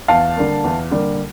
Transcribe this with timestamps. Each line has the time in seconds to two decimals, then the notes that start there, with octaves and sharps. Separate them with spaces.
0.08 E2 F5 A5
0.36 D3 G3 A#3
0.64 E2
0.91 D3 G3 A#3